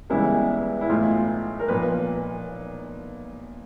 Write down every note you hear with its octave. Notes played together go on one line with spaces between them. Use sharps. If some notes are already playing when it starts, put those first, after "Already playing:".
C#2 C#3 E3 G3 B3 E4
E4
B1 A2 E3 F4
A#4
B1 A#2 F3 B4